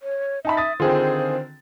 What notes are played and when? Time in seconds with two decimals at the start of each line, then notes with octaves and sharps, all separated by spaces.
0.01 C#5
0.45 D#4 E5 A5 B5
0.57 D#6 A6
0.80 D3 D#3 C4 F4 G#4 C5